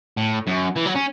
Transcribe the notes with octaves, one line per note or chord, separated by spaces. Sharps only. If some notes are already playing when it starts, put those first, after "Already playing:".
A2
F#2
E3
F#3
C#4